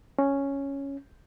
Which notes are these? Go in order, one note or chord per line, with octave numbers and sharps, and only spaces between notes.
C#4